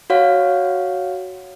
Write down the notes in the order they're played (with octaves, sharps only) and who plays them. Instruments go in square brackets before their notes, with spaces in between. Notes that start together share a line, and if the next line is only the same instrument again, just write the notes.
[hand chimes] F#4 C#5 F5 F#5